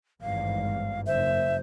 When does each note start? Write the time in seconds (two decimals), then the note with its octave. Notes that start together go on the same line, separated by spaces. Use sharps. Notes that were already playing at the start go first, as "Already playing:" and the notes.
0.22 G#1 E2 G2 F5
1.07 F#1 C5 E5